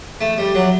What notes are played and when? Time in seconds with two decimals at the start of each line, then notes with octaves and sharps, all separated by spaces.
0.21 A3
0.38 G3
0.55 F#3